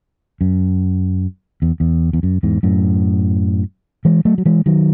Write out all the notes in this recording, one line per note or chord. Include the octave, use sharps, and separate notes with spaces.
F#2
E2
E2
E2
F#2
E2 G#2
F#2 A2
E3 G#3
F#3 A3
F#3
E3 G#3
D#3 F#3